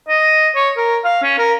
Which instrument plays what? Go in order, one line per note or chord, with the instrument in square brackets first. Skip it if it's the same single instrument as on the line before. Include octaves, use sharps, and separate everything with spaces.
[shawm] D#5
C#5
A#4
F5
C#4
A#4